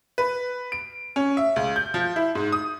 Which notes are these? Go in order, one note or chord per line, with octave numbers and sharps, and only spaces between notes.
B4
D7
C#4
E5
C#2
G6
F3
E4
G#2
D#6